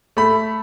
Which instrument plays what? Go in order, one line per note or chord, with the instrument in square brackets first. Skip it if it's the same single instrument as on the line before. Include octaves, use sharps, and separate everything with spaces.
[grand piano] A3 B5